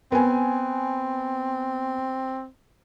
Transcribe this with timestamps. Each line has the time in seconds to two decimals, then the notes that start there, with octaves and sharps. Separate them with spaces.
0.12 B3 C4 G#5